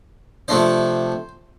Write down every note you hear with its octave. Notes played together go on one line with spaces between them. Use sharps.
C3 F3 A3 D4 C5